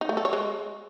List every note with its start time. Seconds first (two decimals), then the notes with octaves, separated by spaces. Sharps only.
0.01 D#4
0.09 A3
0.17 A4
0.25 C#5
0.33 G#3